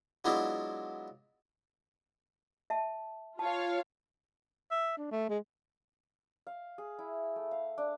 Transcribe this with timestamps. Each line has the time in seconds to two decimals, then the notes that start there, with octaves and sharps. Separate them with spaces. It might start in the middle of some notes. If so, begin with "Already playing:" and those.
0.25 F#3 G#3 B3 D4 E4 F4
2.70 E5 A5
3.39 F4 C#5 F5 A5
4.71 E5
4.98 D4
5.11 A3
5.29 G#3
6.47 F5
6.78 G#4
6.99 E4
7.36 A3
7.51 F5
7.78 D4